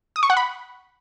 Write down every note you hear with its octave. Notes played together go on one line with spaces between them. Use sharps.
D#6
C#6
F#5
B5